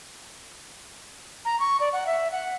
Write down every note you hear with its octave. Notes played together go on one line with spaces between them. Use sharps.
A#5
C#6
D5
F#5
E5
F#5